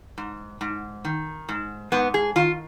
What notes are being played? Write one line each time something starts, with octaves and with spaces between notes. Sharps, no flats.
G#2
G#2
D#3
G#2
G#2 B3
G#4
D#3 F4